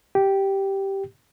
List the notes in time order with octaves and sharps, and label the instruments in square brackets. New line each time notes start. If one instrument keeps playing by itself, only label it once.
[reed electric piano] G4